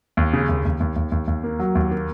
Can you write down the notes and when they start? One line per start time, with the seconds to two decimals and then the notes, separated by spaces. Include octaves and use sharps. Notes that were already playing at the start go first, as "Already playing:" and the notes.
0.17 D#2
0.33 C#3
0.49 D#2
0.65 D#2
0.80 D#2
0.96 D#2
1.12 D#2
1.27 D#2
1.44 A#3
1.59 F#3
1.75 D#2
1.91 A#3